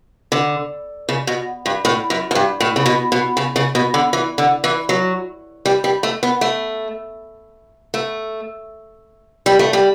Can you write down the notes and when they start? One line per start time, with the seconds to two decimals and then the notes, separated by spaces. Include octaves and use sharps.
0.32 D3
1.09 C#3
1.27 B2
1.66 G2
1.85 A2
2.10 F#2
2.31 F#2
2.35 G2
2.60 A2
2.76 C#3
2.86 B2
3.12 B2
3.37 C#3
3.56 C#3
3.75 B2
3.94 D3
4.13 E3
4.38 D3
4.64 E3
4.89 F#3
5.66 G3
5.84 G3
6.03 A3
6.23 B3
6.41 A3
7.94 A3
9.46 G3
9.59 A3
9.73 G3